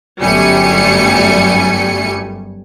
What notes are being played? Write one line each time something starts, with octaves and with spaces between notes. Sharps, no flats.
G1 F#2 G3 A3 G#5 C#7